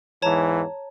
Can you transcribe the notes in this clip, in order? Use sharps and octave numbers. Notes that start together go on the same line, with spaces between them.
E2 G#2 E3 C#5 A5 A#5